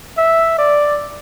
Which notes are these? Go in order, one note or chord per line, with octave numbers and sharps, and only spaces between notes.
E5
D5